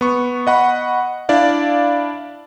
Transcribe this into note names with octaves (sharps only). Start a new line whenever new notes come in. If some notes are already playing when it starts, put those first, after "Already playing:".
B3 C#6
D#5 F#5 B5 C#6
D4 E4 D5 F5